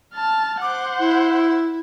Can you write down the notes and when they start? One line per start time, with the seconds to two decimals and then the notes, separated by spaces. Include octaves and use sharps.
0.14 A5 F6
0.62 C5 F#5 D6
0.99 E4